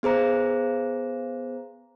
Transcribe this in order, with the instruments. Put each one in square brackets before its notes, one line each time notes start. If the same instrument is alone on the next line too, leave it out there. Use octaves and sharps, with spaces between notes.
[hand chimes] B3 G#4 C5 A#5